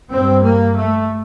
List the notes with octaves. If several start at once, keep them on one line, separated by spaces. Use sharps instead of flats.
G2 C4
A#3
A3